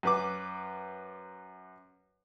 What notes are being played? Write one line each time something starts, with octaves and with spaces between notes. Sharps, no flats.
F#2 B4 D6